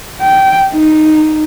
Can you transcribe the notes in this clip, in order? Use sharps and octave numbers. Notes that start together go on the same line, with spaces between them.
G5
D#4